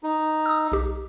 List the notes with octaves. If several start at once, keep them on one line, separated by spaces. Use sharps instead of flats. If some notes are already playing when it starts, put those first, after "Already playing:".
D#4
D#6 E6
B1 G4